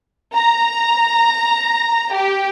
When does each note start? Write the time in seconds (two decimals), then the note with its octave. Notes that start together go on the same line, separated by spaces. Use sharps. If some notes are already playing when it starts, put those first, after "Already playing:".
0.34 A#5
2.13 G4